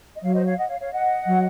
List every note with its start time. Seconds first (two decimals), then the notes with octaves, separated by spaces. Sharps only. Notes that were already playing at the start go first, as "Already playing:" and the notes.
0.16 D#5
0.22 F#3 C#5 F5
0.34 C5 D#5
0.46 C#5 F5
0.57 D#5 F#5
0.69 C#5 F5
0.80 C#5 F5
0.92 D#5 F#5
1.27 F#3